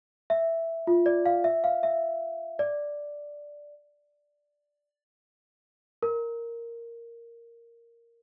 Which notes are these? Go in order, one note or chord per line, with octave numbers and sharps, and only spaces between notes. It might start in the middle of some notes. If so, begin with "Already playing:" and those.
E5
F4
D5
F5
E5
F5
E5
D5
A#4